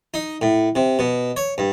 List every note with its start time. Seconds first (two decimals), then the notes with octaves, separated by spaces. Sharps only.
0.14 D#4
0.42 A2
0.75 C3
0.99 B2
1.37 C#5
1.58 G2